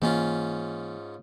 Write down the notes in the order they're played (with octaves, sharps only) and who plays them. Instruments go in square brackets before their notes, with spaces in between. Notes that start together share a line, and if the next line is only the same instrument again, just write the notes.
[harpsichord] G#2 C#4 F4 [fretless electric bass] E3 A#3